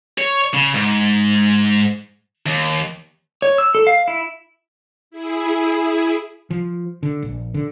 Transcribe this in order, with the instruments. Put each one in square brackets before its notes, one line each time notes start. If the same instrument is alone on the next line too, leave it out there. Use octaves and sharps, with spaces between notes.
[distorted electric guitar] C#5
C#3
G#2
D#2
[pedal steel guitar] C#5
E6
A4
F5
E4
[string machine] E4 G#4
[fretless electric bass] F3
D3
A#1
D3